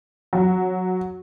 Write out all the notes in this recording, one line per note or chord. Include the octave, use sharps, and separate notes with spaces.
F#3